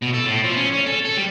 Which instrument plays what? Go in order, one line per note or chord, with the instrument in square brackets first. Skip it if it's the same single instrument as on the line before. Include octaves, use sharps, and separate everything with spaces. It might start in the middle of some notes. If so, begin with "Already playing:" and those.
[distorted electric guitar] B2
A4
A2
F3
C#4
C#4
A4
A4
G3